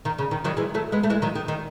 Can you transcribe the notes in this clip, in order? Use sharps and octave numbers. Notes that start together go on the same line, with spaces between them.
D#3
C#3
D#3
D#3 F#3
E3 G#3
F#3 A3
G#3 B3
A3
E3 G#3
D#3 F#3
D#3
D#3